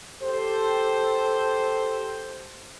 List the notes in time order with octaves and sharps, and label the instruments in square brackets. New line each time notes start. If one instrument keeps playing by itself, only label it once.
[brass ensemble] G4 A4 C5